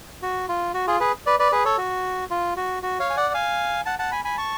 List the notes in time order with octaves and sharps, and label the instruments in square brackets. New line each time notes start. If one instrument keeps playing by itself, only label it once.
[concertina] F#4
F4
F#4
F4 G#4
G#4 B4
B4 D5
B4 D5
G#4 B4
A4 C#5
F#4
F4
F#4
F#4
C#5 F5
G#5
D5 F#5
F5 G#5
F#5 A5
F#5 A5
G#5 B5
G#5 B5
A5 C#6